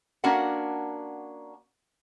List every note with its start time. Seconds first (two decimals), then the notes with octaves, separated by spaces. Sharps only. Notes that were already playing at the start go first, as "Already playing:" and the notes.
0.24 A#3 C#4 D4 F#4 A#4 F#5